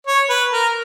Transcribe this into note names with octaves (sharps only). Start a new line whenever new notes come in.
C#5
B4
A#4